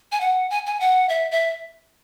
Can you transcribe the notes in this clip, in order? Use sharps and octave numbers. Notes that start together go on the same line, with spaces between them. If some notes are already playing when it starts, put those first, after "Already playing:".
G#5
F#5
G#5
G#5
F#5
E5
E5